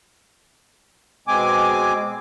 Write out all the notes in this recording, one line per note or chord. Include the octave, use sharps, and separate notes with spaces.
B2 G#3 C4 G#5 D6